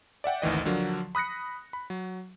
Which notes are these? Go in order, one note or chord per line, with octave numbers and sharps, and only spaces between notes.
D5 E5 F#5 G5
G#1 D2 D#3 E3 D#5
D3 F3 F#3 D4 A#4
B5 D#6 F#6 A#6 C#7
B5
F#3